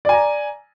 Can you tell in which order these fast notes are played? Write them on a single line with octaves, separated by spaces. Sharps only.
D5 G#5 A#5